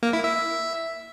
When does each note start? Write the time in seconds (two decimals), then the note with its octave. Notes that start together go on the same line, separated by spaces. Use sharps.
0.03 A#3
0.13 E4
0.24 E5